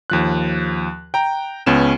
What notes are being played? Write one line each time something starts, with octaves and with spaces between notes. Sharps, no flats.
D#2 F3 F#6
G5 A#5
C#2 B3 C#4 E7